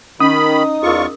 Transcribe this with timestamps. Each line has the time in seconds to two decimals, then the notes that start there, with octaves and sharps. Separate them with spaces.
0.20 D#3 C#4 D#4 B5 D#6
0.83 E2 F4 G#4 A#4 C#6